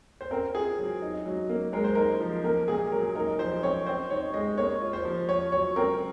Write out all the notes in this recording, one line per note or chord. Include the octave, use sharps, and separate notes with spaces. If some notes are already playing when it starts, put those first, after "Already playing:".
C5
C4 A#4
F4 G#4
F#3
D#4
F#3
A#3
G#3 A#4
C5
D#4 A#4
F3
A#3 A#4
A#2 G#4
F#3 A#4
D#4 A#4
F3 C5
C4 C#5
C4 C5
D#4 C#5
G#3 D#5
A#3 C#5
F4
C5
F3
F4 C#5
F#3 C#5
C4 A#4